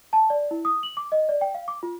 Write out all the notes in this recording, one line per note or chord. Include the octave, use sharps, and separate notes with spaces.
A5
D5
E4
D#6
F#7
D6
D#5
D5
G5
F5
D6
F4